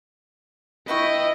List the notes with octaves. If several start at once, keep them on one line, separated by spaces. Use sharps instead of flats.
E4 B4 D#5 G5 C#6